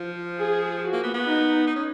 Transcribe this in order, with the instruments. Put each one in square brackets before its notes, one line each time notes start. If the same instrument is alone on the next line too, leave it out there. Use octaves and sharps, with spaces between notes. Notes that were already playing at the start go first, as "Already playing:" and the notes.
Already playing: [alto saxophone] F3
[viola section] G#4
F#4
[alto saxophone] A#3
B3
B3
[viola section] D#4
[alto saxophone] D#4
C#4